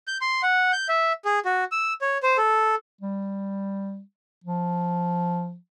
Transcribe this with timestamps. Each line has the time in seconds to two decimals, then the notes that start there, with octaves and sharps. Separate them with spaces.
0.07 G6
0.21 C6
0.43 F#5
0.73 G6
0.89 E5
1.25 G#4
1.45 F#4
1.72 E6
2.01 C#5
2.23 C5
2.37 A4
3.01 G3
4.44 F3